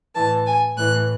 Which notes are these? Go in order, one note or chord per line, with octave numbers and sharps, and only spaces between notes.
A2 E3 A5
G#5
A2 E3 F#6